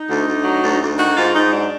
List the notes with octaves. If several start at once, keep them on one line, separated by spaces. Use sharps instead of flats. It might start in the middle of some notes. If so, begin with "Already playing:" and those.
Already playing: D#4
D2
D2
F#3
D2
D2
D#3 F#4
G#2 F4
G#2 D#4
F#3 D4